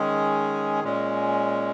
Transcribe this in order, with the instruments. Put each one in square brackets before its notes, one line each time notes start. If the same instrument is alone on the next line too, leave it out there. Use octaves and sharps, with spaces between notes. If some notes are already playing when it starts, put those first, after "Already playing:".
Already playing: [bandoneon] D#3 G#3 C#4 G#4
A#2 G#3 C#4